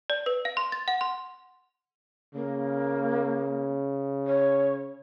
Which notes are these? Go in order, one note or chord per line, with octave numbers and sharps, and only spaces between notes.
D5
B4
F5
C6
A6
F#5
C6
C#3 A#3
C#5